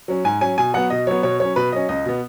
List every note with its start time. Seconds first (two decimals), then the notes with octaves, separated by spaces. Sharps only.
0.08 F#3 C#4
0.24 G#2 G#5
0.41 F#3 C#4 G#5
0.58 B2 G#5
0.74 F#3 B3 F#5
0.90 B2 D#5
1.07 F#3 B3 C#5
1.23 B2 C#5
1.40 F#3 C#4 C#5
1.56 B2 B4
1.72 F#3 C#4 D#5
1.89 C#2 D#5
2.05 B2 B3